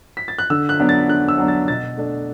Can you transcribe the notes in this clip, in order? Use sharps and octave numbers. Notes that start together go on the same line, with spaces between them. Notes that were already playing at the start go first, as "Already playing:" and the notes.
B6
A6
F#6
D3 E6
F#6
F#3 B3 D4
A6
D3 F#6
E6
F#3 B3 D4
A6
B2 A6
A3 D4